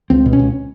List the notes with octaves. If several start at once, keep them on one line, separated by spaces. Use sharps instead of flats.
C#2 C4
B2
C#4
C#2